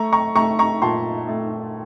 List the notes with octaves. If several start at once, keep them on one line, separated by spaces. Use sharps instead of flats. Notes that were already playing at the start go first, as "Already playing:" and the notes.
Already playing: A3 A#5 C#6
A#5 C#6
A3 A#5 C#6
A#5 C#6
A#2 A5 C6
A3